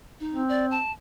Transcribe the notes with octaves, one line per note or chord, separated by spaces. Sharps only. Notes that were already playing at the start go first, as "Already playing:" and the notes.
D#4
C4
D5
A5